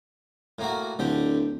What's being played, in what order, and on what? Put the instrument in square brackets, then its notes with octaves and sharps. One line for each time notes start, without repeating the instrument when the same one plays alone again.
[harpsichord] A2 A#3 F#4
[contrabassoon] D1 [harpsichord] D3 G4